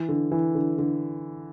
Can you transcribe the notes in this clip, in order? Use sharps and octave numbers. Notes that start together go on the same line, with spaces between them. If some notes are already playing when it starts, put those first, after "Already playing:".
Already playing: E3
D3
E3
D3
D3